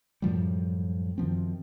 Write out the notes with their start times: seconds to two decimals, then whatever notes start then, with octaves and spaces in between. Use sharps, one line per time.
0.22 F#2 A2 F3 G3
1.18 F#2 D#3 F3 C4